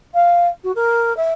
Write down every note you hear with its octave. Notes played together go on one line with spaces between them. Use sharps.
F5
F#4
A#4
E5